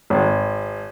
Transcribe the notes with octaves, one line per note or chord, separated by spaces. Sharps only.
G#1